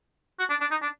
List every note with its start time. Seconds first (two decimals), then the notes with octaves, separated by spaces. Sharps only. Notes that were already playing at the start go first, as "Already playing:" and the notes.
0.39 F#4
0.50 D4
0.61 D4
0.71 D#4
0.82 D4